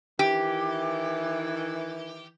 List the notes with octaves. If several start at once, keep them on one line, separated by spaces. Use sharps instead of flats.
D#3 E3 G4